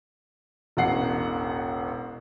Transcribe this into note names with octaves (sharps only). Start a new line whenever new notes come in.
E1 A1 F#5 C7